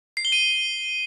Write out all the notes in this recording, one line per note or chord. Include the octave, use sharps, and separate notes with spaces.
C7
G7
D#7